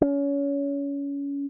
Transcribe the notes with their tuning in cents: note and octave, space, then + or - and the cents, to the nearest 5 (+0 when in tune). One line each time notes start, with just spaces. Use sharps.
C#4 +25